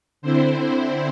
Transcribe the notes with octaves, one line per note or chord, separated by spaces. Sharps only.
D3 C4 E4 C5